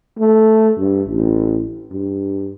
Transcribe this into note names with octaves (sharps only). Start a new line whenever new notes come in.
A3
G2
A1
G2